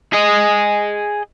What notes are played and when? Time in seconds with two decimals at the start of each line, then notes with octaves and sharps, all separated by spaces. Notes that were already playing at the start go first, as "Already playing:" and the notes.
0.13 G#4 D#5